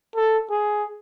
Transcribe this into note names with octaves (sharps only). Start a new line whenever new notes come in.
A4
G#4